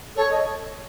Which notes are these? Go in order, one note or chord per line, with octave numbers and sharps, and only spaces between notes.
A4 C#5
D#5